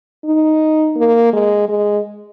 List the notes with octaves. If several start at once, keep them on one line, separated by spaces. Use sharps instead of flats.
D#4
A#3
G#3
G#3